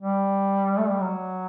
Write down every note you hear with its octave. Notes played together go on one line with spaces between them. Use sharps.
G3
A3
G3
F#3